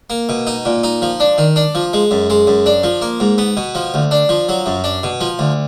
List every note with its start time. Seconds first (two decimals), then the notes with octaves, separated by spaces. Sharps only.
0.10 A#3
0.29 B2
0.47 D#4
0.65 A#2
0.83 D#4
1.02 F3
1.20 D4
1.38 D#3
1.56 D4
1.75 F3
1.93 G#3
2.11 F#2
2.30 G#3
2.47 F#2
2.66 D4
2.83 F3
3.02 A#3
3.20 G#2
3.38 B3
3.57 B2
3.75 F3
3.94 D2
4.11 D4
4.29 F3
4.49 F#3
4.66 F#2
4.84 D4
5.03 B2
5.21 F3
5.39 D2